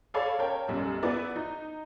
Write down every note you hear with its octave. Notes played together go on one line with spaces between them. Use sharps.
G#4 A4 C#5 D5 F5 B5
A#4 C#5 G5 A5
B1 F#2 G3
B3 E4 G#4 B4 D5
D#4